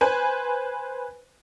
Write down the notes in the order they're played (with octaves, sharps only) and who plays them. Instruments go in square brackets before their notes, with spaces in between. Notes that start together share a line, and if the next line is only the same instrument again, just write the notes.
[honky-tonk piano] B4 C5 G#5